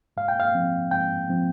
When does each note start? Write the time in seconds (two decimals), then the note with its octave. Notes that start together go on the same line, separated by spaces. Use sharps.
0.17 G#2 F5
0.28 G5
0.40 F5
0.55 F3 C4
0.91 G#2 G5
1.29 F3 C4